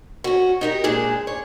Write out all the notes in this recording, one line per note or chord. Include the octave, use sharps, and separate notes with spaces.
C#4 F#4
D#4 G4 A#4
A#2 G#3 D4 G#4
C#5